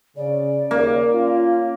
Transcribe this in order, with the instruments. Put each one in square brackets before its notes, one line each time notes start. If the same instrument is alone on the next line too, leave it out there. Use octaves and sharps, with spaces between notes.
[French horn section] C#3 [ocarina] D5
[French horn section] D#2 C#3 [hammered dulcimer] A#3
[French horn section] C#4 F4